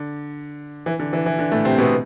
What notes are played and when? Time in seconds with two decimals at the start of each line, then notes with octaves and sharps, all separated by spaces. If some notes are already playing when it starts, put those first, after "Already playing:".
Already playing: D3
0.86 E3
1.00 D3
1.13 E3
1.26 E3
1.39 D3
1.51 A2 A3
1.65 C3 C4
1.78 B2 B3